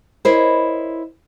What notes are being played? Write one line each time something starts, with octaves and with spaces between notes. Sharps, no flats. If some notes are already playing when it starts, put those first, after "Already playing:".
E4 A#4 C5 C#5 D#5